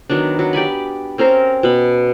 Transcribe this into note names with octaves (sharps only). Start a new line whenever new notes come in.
D#3 F#3 B3 D4
F#3
G4 D5 G#5 B5
C4 C#4 A#4 C5
B2 B5